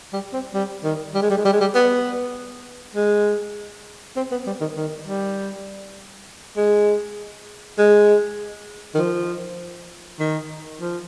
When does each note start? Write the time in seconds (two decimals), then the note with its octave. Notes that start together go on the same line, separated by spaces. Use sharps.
0.13 G3
0.33 C4
0.54 G3
0.84 D#3
1.15 G3
1.22 G#3
1.30 G3
1.37 G#3
1.45 G3
1.53 G#3
1.61 G3
1.75 B3
2.95 G#3
4.17 C4
4.31 B3
4.47 G3
4.61 D#3
4.77 D#3
5.07 G3
6.57 G#3
7.78 G#3
8.95 D#3
8.98 F3
10.20 D#3
10.80 F3